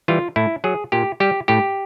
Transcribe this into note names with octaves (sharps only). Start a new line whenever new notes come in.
E3 G3 F4
A2 E4
F#3 G#4
A#2 G4
G3 G4
A2 G4